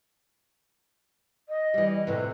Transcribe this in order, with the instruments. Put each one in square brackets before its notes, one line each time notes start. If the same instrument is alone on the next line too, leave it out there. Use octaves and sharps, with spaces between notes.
[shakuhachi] D#5
[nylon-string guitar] E3 G3
[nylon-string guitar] A2 C3 [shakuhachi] B4